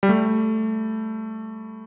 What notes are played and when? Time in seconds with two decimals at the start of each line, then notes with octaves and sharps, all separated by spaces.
0.03 G3
0.09 A3